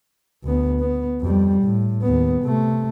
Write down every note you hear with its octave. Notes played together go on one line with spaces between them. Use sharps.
D2 B3
B3
F2 G3
A2
D#2 B3
C3 A3